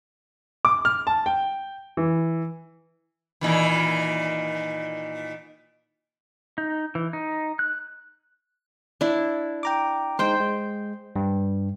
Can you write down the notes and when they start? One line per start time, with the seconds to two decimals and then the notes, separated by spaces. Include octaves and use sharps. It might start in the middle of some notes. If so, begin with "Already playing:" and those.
0.65 D6
0.85 F6
1.07 A5
1.26 G5
1.97 E3
3.41 A#2 D#3 E3
6.58 D#4
6.95 E3
7.13 D#4
7.59 F#6
9.01 D4 E4
9.63 G5 A#5 D6
10.19 G#3 D#4 C5 G5
10.40 G#3
11.16 G2